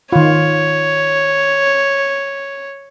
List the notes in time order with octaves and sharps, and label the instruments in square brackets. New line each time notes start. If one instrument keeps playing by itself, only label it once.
[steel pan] D#3 F4 [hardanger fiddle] C#5